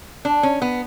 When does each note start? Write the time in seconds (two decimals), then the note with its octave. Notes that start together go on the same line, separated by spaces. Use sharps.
0.25 D4
0.43 C#4
0.62 B3